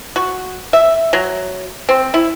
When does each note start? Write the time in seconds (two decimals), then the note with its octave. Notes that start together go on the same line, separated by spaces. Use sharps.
0.16 F#4
0.73 E5
1.13 F#3
1.89 C4
2.14 E4